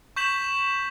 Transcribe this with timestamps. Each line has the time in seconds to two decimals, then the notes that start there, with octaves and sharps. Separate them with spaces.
0.16 C#6 G6 B6 E7 F#7